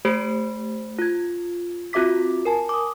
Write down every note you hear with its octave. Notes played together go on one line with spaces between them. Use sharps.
A3 G4 C5 B5 C7 D7
F4 G#6
C4 F4 F#4 E5 D6 B6
A#4 G#5 A5
D6 D#6